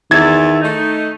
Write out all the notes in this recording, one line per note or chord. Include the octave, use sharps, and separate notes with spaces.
E2 D#3 E5 G#6 A6
A3 D#4